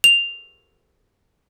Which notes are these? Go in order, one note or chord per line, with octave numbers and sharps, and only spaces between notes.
F7